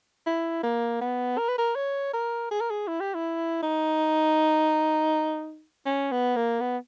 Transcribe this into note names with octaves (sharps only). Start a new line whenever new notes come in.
E4
A#3
B3
A#4
B4
A#4
C#5
A#4
G#4
A#4
G#4
E4
G4
E4
D#4
C#4
B3
A#3
B3